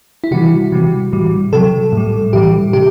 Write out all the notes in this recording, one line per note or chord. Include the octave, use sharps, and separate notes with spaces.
E4
C3 E3 G3 F#4
C3 E3 G3
A2 E3 G3
C3 F#3 A4
A2 G3
A2 E3 G3 G4
C3 G4